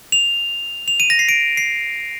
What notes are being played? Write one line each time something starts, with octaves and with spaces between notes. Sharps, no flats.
F7
F7
D#7
A#6
C7
D7
C7